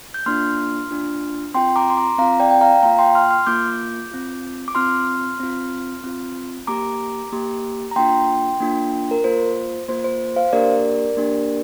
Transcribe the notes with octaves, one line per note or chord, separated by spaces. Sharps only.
G6
A#3 D4 F4 C6 F6
A#3 D4 F4
C4 F4 G5 C6
A#5 D6
C6
A#5 D6
C4 F4 F5 A#5
D5 G5
G5
F5 A#5
A#3 F4 F5 A#5
G5 C6
C6 F6
C6 F6
A#3 F4 D6 G6
C4 F4
D6
C4 F4 C6 F6
C4 F4
C4 F4
A#3 G4 A#5 D6
A#3 G4
A#5
A#3 D4 F4 G5 C6
A#3 D4 F4
A#4
A#3 F4 C5
A#3 F4 C5
C5
C5 F5
A#3 D4 G4 A#4 D5
A#3 D4 G4